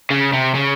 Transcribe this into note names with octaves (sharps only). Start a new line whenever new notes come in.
C#3
C3
C#3